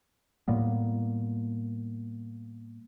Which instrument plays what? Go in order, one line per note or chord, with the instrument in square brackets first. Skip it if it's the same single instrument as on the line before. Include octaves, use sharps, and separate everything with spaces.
[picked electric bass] A2 G3 A#3 B3